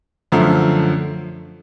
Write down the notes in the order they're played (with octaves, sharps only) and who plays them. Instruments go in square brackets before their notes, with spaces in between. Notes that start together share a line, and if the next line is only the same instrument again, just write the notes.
[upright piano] F#2 D3 F3 A3